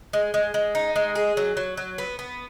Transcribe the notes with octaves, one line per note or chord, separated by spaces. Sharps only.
G#3
G#3
G#3
D#4
G#3
G#4
F#3
F#3
F#3
B3
B3